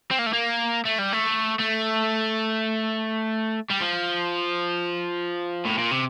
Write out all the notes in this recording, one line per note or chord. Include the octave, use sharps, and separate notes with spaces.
C4
A#3
A3
A#3
A3
G3
A3
A3
G3
F3
A2
A#2
C3